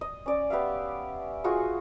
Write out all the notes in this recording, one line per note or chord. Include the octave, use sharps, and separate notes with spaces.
D#5
C#4 D5
B3 G4 E5 F5
F4 F#4 G#4 C#6